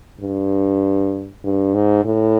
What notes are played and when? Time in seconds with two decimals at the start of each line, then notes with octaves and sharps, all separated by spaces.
0.21 G2
1.44 G2
1.74 G#2
2.05 A2